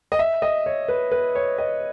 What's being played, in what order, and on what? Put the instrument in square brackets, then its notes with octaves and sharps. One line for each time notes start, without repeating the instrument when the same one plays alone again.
[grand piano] D#5
E5
D#5
C#5
B4
B4
C#5
D#5